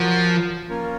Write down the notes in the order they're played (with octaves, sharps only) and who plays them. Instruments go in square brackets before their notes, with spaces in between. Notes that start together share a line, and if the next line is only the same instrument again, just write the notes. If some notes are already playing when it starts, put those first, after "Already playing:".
Already playing: [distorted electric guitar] F3 [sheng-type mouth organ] F#4 A#4 C#5 F#5
[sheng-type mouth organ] A#3 C#4 F4 A#4 C#5